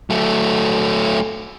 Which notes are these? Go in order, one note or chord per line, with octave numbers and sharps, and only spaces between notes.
F#3 A3